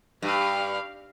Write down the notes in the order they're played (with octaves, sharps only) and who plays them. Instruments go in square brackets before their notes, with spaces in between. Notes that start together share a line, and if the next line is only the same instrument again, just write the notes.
[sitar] G2 [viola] G4 F5